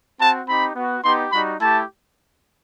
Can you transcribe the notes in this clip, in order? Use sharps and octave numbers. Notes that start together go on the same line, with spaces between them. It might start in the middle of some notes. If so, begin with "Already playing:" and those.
C4 F#4 A5
C4 D#4 G4 B5
B3 F#4
B3 D#4 G4 C6
G3 D#4 F#4 B5
A3 E4 G4 A5